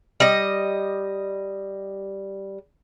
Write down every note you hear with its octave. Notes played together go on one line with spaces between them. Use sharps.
G3 D#5